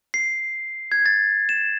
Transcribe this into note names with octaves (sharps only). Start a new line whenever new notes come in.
C7
G#6
A6
E7